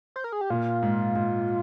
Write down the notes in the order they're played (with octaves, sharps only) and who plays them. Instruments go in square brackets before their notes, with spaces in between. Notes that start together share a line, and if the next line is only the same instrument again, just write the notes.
[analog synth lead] C5
A#4
G#4
G4
[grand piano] A#2 [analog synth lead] F4
[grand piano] G#2
G#2